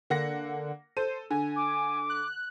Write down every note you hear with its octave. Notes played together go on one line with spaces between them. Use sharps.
D3 A#3 F#5 A#6
A4 C5 D#7
D3 G#5
D6
F#6